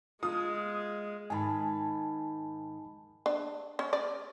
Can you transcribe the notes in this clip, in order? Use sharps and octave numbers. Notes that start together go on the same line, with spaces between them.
G#3 F4 D#6
G#2 D#3 G#5 A5 B5
D4
C#4
D5